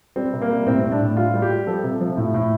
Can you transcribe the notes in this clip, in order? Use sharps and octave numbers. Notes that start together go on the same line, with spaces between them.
G3 C4
C3
A#3
G3
A2 C4
A2 C4
D4
A2
G3 F4
G3
G4
G3
F3 A4
C3
F3
A2
A2